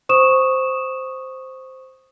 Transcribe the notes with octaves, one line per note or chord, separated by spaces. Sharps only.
C5 C#6 D#6 E7